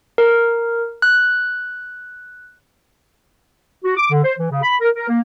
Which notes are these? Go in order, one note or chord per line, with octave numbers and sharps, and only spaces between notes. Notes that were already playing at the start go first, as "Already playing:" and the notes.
A#4
F#6
F#4
D6
D3
C5
E3
C#3
B5
A#4
A#4
A#3